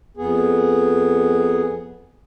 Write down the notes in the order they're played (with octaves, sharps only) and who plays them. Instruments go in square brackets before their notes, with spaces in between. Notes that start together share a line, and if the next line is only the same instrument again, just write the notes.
[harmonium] F2 B3 G#4